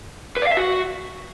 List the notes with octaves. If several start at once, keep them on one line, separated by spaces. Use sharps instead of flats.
B4
D5
F5
E5
F#4